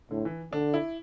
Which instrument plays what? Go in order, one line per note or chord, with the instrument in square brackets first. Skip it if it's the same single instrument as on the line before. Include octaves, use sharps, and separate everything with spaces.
[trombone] A2 [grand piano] D3
[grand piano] E3
[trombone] D3 [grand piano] D4
[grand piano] E4